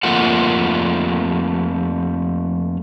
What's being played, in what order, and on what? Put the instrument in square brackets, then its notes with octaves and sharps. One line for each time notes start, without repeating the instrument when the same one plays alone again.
[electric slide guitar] F2 A3 A#3 F4 A#4 F#5